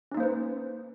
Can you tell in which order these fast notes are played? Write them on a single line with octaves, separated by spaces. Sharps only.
C#4 D#4 A#3 C5 B4